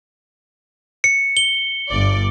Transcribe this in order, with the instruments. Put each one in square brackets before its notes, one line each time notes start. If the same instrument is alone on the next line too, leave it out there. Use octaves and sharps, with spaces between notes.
[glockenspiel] C#7
G7
[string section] G1 D5